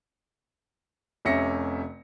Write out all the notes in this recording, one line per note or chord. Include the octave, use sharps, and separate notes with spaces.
F1 C3 C#4 E5 A#6 C#7